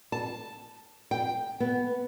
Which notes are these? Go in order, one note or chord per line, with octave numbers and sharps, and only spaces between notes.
A5
G5
B3